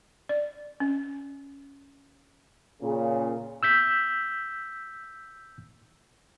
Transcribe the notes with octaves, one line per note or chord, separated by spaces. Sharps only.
D5
C#4
A#2 C#3
E6 G6 B6